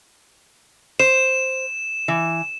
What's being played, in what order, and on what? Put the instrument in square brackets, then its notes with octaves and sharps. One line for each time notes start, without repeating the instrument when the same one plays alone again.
[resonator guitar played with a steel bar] C5 [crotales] E7
[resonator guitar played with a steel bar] E3